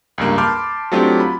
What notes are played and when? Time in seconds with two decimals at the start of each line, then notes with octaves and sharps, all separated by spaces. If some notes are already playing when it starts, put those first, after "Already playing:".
0.18 C#2 G2 A#3
0.38 A5 B5 C6 D6 F6 G6
0.92 F#3 A3 C4 D4 F4 G4
1.20 B5